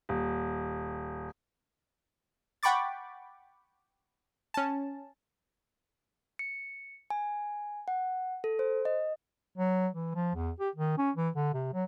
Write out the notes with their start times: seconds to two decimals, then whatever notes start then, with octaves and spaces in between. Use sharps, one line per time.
0.09 D#1
2.63 F#5 G5 B5 C#6 D6 A6
4.54 C#4 A5
6.39 C#7
7.10 G#5
7.88 F#5
8.44 A4
8.59 C5
8.85 D#5
9.58 F#3
9.93 E3
10.15 F3
10.35 E2
10.60 G4
10.76 D#3
10.98 C#4
11.16 E3
11.35 D3
11.54 C3
11.74 F#3